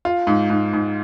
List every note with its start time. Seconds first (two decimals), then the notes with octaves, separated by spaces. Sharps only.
0.05 F4
0.27 G#2
0.50 G#2
0.73 G#2